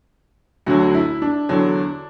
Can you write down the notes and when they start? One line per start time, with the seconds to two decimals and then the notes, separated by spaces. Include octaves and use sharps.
0.66 D2 D3 F#3 F#4
0.94 E4
1.22 D4
1.49 E2 D3 F#3